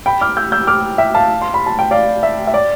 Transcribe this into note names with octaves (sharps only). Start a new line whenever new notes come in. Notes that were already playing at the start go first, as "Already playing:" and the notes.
G5 B5
D6 F6
E6 G6
E6 G6
D6 F6
E5 G5
F5 A5
C6
B5
A5
G5
D5 F5
E5
E5
D5